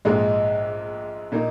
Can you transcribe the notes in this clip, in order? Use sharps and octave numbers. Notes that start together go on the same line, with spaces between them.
A#1 G#2 G#3
A#2 A#3 D#4